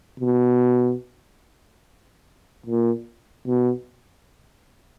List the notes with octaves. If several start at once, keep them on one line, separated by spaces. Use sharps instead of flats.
B2
A#2
B2